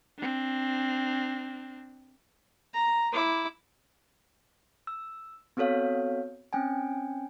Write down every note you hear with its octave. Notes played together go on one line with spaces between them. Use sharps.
C4 D4
A#5
E4 D6
E6
B3 C4 F#4 A4 C#5 F5
C4 C#4 G5 G#5